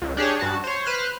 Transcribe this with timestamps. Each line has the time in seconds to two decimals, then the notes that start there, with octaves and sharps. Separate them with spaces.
0.02 C#2
0.17 D4 G4 G#4 C#5
0.39 G2 F#4 A5
0.64 C5 C#5
0.86 B4 C5 F6 F#6